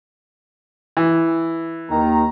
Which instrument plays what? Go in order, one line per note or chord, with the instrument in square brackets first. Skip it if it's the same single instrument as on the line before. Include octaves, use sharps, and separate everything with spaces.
[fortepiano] E3
[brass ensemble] D#2 D#3 A#5